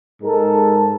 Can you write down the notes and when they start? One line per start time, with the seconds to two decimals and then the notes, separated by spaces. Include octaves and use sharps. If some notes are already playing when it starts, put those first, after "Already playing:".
0.23 G#2 G#3 A4 A#4